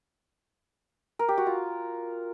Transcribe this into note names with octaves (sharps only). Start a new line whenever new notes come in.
A#4
G4
F#4
F4